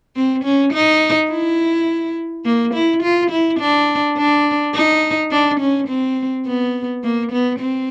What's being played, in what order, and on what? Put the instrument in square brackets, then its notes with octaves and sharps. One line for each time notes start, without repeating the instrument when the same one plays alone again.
[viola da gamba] C4
C#4
D#4
E4
A#3
E4
F4
E4
D4
D4
D#4
D4
C#4
C4
B3
A#3
B3
C4